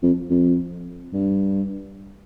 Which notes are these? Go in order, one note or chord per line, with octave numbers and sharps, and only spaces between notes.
F2
F2
G2